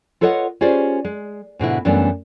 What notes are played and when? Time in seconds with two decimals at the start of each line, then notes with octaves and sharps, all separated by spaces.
0.21 F4 A4 B4 C#5 D#5 F#5
0.61 C#4 F4 G4 G#4 C5 D5
1.05 G#3
1.59 G#2 B2 D3 E4
1.85 F#2 E3 G3 A3 B3 D4